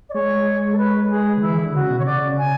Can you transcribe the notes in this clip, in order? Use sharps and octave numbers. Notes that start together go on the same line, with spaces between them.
D5
G#3 C#5
A4
B4
G#4
D3
E3 E4
D3
C#3 F#4
B2
C#5
C#3 D5
G#5